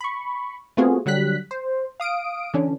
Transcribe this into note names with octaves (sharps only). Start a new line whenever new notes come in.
B5 C#6
A3 B3 C4 F4 F#4 G#4
D3 F#3 G3 F#6 B6
C5
F5 D#6 D7
D3 E3 C#4 D4